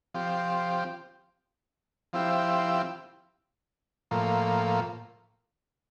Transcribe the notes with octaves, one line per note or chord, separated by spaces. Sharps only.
F3 C4 G4
F3 C4 E4 G4
A2 F3 A#3